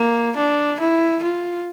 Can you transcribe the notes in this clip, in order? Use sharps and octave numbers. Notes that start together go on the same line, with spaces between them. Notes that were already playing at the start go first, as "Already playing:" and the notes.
Already playing: A#3
D4
E4
F4